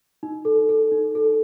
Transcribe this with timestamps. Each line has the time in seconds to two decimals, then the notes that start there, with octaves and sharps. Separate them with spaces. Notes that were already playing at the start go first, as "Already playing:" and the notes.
0.23 D#4
0.45 A4
0.69 A4
0.92 D#4
1.15 A4